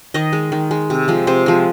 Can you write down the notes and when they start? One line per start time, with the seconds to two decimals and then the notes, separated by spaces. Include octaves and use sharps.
0.14 D#3 D#5
0.33 G#3
0.52 D#3
0.71 G#3
0.90 C3
1.08 F3 G#3
1.27 C3 C5
1.46 F3 G#3